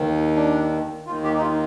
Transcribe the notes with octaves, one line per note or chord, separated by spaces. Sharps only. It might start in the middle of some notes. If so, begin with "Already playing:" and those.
Already playing: D#2 D#3
D4
D#2 D#3 F4
G4
D#4
F4